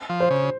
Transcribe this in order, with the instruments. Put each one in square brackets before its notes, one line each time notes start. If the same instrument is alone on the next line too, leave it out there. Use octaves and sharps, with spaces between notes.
[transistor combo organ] F3
[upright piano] C5
[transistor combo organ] C#3